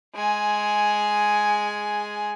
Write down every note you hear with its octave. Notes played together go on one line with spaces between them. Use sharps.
G#3 G#5